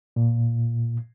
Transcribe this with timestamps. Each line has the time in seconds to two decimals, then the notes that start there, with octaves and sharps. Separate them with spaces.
0.16 A#2